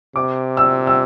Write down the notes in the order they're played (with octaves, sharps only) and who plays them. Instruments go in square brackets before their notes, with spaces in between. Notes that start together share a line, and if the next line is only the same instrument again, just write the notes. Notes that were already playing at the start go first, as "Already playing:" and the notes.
[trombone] C3 [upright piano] D6
[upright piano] E6
E6